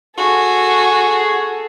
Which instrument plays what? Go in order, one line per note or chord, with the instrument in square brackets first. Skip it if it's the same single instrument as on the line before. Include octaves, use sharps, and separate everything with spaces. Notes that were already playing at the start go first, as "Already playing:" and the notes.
[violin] F#4 [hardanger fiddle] G#4 A4